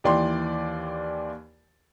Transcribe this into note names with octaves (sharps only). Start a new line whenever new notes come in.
D#2 E3 D5 G5 C6